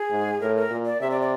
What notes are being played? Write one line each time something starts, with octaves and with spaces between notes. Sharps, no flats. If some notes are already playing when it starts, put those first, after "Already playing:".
Already playing: G#4
G#2
A2 A#4
A#4
A#2
D5
C3 E5
D5
D5